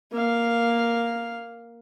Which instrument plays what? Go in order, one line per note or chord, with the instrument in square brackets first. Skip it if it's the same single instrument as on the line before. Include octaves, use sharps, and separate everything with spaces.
[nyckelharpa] A#3 F5